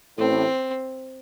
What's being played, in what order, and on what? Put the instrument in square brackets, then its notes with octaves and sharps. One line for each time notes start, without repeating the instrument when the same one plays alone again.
[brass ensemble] A1 A2 [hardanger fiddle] C4